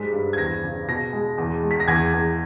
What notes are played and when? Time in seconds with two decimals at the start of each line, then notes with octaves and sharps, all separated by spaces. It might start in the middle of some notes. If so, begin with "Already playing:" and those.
Already playing: G#2 G3 G#3 B6
0.13 G2
0.33 G#6
0.38 E2 A#6
0.64 C#3
0.88 B2 A#6
1.13 G#3
1.38 E2
1.63 G#3
1.71 B6
1.80 A#6
1.88 E2 G#6
2.13 E2